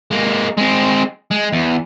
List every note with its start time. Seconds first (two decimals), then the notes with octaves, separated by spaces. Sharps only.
0.11 G#3 A#3
0.58 G#3 C4
1.31 G#3
1.52 E2